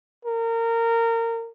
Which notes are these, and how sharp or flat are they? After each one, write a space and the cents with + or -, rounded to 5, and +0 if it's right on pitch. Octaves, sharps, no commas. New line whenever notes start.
A#4 -25